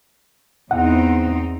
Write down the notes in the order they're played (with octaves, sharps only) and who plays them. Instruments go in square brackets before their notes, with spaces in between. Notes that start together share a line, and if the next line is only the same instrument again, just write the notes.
[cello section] E2 C4 D#4 [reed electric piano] F#5